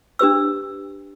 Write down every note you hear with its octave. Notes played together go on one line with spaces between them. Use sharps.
D4 G4 B4 E6